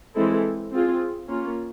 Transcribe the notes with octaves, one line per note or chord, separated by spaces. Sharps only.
E3 G#3 C4 E4 A4
C4 F4 G#4
A#3 C#4 F4